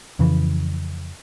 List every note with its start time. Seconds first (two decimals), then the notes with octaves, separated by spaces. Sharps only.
0.19 F2 C#3 E3